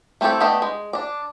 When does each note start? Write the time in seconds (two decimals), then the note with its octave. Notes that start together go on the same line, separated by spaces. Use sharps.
0.21 A3 C4 E4 G4 A4
0.40 A3 B3 D4 G4 D#5
0.62 G#3
0.93 D4 D5